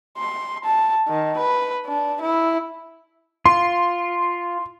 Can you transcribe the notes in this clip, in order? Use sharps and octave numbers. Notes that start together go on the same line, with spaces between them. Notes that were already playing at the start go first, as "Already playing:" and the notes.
C6
A5
D#3
B4
D4
E4
F4 C6